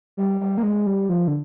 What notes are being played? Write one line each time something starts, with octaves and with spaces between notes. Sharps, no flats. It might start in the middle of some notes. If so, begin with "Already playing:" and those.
G3
G3
A#3
G#3
G3
F3
D3